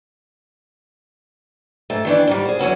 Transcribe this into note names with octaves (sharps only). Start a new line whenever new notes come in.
G#2 A3
D#3 E3 D4
G#2 D#3 G3
G#4 C5
E2 F#3 C#4 F#4